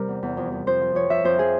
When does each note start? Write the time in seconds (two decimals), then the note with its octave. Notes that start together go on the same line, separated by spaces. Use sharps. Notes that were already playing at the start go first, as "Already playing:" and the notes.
Already playing: C3 G3 A#4
0.08 E2
0.23 E2
0.37 F2
0.52 F2
0.67 F2 C5
0.81 F3
0.95 F2 C#5
1.10 F3 E5
1.24 F2 C5
1.39 F3 G#4